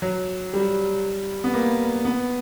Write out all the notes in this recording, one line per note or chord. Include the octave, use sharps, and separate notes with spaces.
F#3
G3
B3
A#3
B3